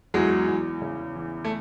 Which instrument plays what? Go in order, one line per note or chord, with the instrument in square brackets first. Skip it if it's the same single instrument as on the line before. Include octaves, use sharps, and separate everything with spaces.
[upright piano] E2 [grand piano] F#3 G#3
[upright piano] E2
C#3
E3
[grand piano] A3